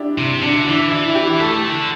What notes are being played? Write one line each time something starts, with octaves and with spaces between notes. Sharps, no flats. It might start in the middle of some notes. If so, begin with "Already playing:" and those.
Already playing: D4 E4 G4
C3
D3 D4
E4
E3 D4
E4
E4
G4
A3 A4
D3